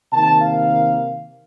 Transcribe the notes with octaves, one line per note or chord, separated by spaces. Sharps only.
C3 D#3 A#3 A5
F5